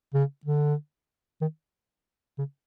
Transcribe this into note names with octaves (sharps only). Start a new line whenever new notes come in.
C#3
D3
D#3
C#3